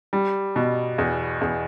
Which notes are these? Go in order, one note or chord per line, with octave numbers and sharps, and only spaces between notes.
G3
B2
E2
E2